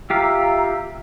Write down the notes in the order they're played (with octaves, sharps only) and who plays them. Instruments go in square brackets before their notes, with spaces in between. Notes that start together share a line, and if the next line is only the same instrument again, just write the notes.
[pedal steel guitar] F4 G4 F5 [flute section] E5 A#5 E6